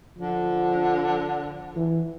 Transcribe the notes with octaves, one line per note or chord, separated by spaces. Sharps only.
D3 F3
E3